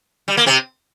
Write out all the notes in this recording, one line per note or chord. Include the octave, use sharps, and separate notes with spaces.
G3
A#3
C3 C4